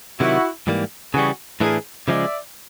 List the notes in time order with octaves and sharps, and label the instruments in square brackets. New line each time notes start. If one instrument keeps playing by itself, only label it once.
[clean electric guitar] C3 D#3 F#3 [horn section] E4 F#4
[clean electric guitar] G#2 E3 G3 A#3
[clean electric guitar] C#3 E3 G3 [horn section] F#4 G#4
[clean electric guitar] A2 E3 A3 D4 [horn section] G#4 A#4
[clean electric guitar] C#3 F3 G#3 [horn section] D5 E5